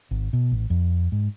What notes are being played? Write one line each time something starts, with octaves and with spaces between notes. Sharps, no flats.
G#1
B2
A1
F2
G#2